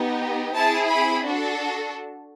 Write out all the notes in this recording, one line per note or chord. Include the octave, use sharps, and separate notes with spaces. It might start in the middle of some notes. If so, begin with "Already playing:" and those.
Already playing: B3 D#4 G4
C4 E4 G#4 A5
B5
D4 F#4 A4